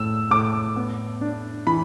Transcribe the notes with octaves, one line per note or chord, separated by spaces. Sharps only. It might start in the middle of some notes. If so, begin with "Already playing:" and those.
Already playing: A2 E6
A2 D6
B3
D4
E3 B5